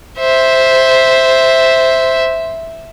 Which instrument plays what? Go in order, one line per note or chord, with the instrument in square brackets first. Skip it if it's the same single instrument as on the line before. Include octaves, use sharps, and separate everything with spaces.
[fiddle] C5 E5